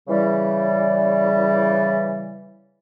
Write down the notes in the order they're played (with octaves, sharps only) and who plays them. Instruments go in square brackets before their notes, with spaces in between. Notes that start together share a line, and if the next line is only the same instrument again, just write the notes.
[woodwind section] C#3 E3 G3